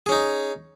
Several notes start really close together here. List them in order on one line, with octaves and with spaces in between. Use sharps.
G#4 C#4 D#4